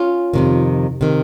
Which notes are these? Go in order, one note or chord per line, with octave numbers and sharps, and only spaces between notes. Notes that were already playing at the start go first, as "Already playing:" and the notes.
Already playing: C#4 F4
F2 C3 D#3
C3 D#3